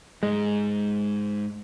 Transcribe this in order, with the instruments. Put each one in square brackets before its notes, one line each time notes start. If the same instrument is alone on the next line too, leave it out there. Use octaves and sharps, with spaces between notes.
[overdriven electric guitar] G#2 [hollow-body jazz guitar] G#3